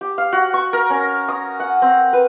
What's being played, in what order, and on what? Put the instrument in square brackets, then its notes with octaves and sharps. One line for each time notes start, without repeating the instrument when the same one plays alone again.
[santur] G4
F5
F#4
C#6
A#4
C#4
D#6
F#5
C4
B4